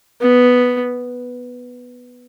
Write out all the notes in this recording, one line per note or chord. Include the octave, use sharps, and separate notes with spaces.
B3